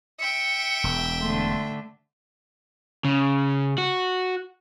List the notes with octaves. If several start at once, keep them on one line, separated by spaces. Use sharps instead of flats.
E5 G5 C#7
E1
D3 A3 C6
C#3
F#4